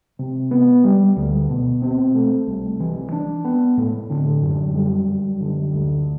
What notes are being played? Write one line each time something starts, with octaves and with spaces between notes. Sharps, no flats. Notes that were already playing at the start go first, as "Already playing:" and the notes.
C3
B3
G3
D2
B2
C4
A3
C2
E3
D4
B3
A2
D3
F#2
G3
F#2
D3
D2